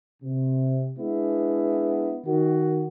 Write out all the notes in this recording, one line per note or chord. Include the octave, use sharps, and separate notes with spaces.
C3
G#3 B3 D4 E4
D#3 F#4